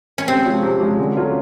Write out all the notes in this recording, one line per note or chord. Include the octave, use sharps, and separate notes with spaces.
C#4
C3 C4
F3 G#3 C#4
C3
F3 G#3 C#4
D3
F#3 A3 C#4 F4